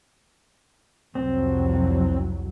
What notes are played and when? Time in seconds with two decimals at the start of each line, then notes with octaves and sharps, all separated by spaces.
1.15 C2 F2 F#3 C4